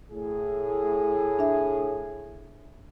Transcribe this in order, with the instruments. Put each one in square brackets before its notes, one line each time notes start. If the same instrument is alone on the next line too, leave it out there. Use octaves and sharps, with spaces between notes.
[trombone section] A2 G#4
[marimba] D4 E5